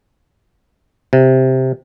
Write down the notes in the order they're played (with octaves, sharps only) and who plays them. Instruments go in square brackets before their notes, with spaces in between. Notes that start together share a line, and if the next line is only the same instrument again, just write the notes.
[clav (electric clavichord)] C3